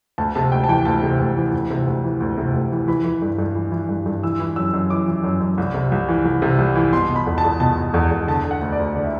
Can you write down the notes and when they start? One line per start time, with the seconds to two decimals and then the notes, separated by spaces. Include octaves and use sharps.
0.18 D2 A5
0.35 C3 A5
0.52 D2 G5
0.64 A5
0.68 E3 G5
0.85 D2 A5
1.03 C3
1.20 D2
1.37 E3
1.53 D2
1.70 C3
1.87 D2
2.04 E3
2.20 D2
2.37 C3
2.54 D2
2.72 E3
2.88 E3 B5
3.04 E3
3.22 G2
3.39 G2
3.56 E3
3.72 E3
3.89 G2
4.06 G2
4.23 E3 E6
4.40 E3
4.56 F#2 E6
4.74 F#2
4.90 E3 D6
5.08 E3
5.24 F#2
5.41 F#2
5.58 C2
5.74 C3
5.92 C2
6.08 E3
6.25 C2
6.42 C3
6.59 C2
6.75 E3
6.93 B2 C6
7.10 B2
7.16 B5
7.26 E2
7.38 A5
7.44 E2
7.60 B2 A5
7.77 B2
7.94 E2
8.11 E2
8.27 D3 A5
8.44 D3
8.51 F#5
8.61 D2
8.72 D5
8.79 D2
8.95 D3 D5
9.04 E5